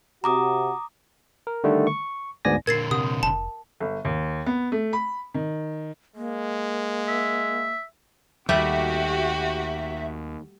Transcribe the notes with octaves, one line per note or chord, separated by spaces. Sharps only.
C3 F#4 A#5 D6 D#6
A#4
D3 D#3 G3 A3
C#6
D2 G#2 B3 D5 G#5 A#6
A#2 D3 A#4 G#6 A6 C7
C3 F#5 D#6
F1 A5
G1
D#2
B3
A3
B5
D#3
G#3 A#3
E5
D#2 G3 A3 F#4 G4 E5